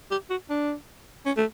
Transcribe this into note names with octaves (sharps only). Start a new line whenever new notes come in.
G4
F#4
D4
C#4
A3